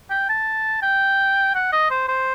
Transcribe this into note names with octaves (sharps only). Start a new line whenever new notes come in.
G5
A5
G5
F#5
D#5
C5
C5